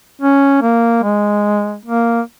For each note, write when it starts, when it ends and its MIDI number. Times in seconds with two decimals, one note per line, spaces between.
0.22 0.62 61
0.62 1.02 58
1.03 1.78 56
1.85 2.21 58